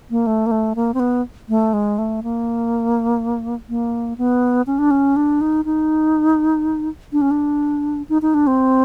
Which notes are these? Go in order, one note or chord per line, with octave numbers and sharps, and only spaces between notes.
A#3
A3
A#3
A3
A#3
C4
B3
A3
G#3
A3
A#3
A#3
B3
C#4
D4
C#4
D4
D#4
D#4
D4
C#4
D4
D#4
D#4
D4
C4